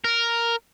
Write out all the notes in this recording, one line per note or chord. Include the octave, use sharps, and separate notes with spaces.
A#4